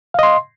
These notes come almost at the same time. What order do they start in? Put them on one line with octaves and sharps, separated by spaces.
F5 D#5 C6